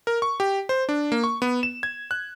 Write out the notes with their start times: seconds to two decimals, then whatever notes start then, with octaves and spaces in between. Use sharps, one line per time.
0.07 A#4
0.22 C#6
0.40 G4
0.69 C5
0.89 D4
1.12 A#3
1.24 C#6
1.42 B3
1.63 E7
1.83 G#6
2.11 F#6